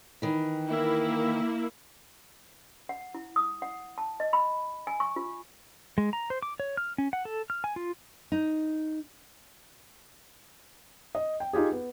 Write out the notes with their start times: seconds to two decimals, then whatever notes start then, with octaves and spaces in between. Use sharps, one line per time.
0.22 D#3 E3
0.67 A#3 E4
2.89 F#5
3.14 E4
3.36 D#6
3.62 F#5
3.98 A5
4.20 D#5
4.33 B5
4.87 G#5
5.00 C#6
5.16 F4
5.98 G#3
6.13 A#5
6.30 C5
6.42 D6
6.60 C#5
6.77 F6
6.98 C#4
7.13 F#5
7.25 A4
7.50 F6
7.64 G#5
7.76 F4
8.32 D#4
11.15 D#5
11.40 G5
11.53 D#4 F4 G4 G#4
11.72 B3